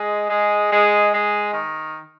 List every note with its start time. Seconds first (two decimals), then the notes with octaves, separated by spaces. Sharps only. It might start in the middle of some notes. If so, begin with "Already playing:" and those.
Already playing: G#3
0.29 G#3
0.71 G#3
1.13 G#3
1.54 D#3